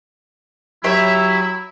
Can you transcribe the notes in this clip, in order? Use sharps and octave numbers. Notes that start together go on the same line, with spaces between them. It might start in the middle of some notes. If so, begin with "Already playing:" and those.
F#3 E4 G4 C#5 E5